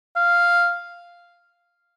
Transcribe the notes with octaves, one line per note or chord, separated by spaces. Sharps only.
F5